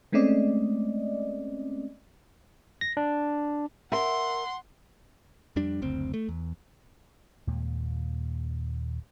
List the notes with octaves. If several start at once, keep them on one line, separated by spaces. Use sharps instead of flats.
G#3 A3 C4 C#4 D5 D#5
A#6
D4
A#4 E5 F#5 C6
F2 G3 D4
F#1 D2 C4
A3
E2
D#2 A#2 G#3